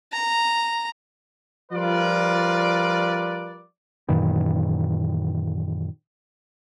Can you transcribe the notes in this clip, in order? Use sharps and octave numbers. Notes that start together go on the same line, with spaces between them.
A#5
F3 G3 F4 A#4 B4 D5
F#2 A#2 D#3 E3